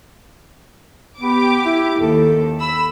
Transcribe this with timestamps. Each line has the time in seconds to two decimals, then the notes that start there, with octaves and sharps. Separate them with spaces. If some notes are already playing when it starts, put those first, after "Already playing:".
1.21 B3 G4 D6
1.66 E4
2.00 D#2 A4
2.61 B5 E6